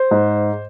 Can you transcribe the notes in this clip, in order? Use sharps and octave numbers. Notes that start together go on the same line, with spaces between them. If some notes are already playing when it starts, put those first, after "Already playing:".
Already playing: C5
G#2